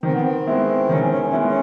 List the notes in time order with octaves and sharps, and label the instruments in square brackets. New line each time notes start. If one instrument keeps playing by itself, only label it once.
[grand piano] D#3 [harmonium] C4
[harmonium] B3
C4
[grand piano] G#3 B3 E4
[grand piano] D#3 [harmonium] C#4
[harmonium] C#4
C#4
[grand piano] G#3 B3 E4
[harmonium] C#4